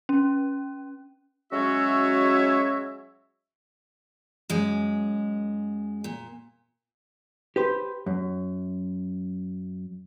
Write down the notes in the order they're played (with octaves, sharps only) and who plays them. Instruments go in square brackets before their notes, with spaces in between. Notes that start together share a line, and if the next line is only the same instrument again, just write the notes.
[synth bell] C#4
[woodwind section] F#3 G#3 C#4 F#4 C#5 E5
[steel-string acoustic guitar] F#2 G#3
A#2
[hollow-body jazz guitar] G4 B4 C5
F#2